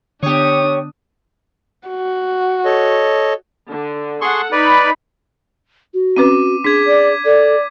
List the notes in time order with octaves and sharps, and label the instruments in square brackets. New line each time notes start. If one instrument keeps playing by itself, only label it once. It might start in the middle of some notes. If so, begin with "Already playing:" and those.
[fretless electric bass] D3 B3 [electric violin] D4 D#6 [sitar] G4 C#5
[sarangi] F#4
[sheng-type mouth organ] A4 C#5 D#5
[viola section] D3
[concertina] G#4 C6 C#6 [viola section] A4 F#5
[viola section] D#4 B5 [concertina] B4 D5
[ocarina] F#4
[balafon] C4 C#4 B4 [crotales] D6 D#7
[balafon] D4 [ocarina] G#4 [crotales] G#6 B6
[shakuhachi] D5
[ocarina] A4 [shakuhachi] D5